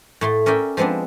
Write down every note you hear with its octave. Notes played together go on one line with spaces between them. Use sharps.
A2 A3 C6
C#4 A#4 D5 E5 G5
F3 G#3 B3 C4 D4